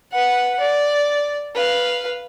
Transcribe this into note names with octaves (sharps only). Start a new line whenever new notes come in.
B4 F#5
D5
B4 F5